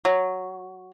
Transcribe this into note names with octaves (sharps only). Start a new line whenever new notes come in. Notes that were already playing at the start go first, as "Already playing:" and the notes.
F#3